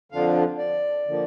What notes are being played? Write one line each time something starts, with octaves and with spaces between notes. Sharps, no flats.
F2 D3 F3 D4 F4 F5
D5
D3 F3 A#3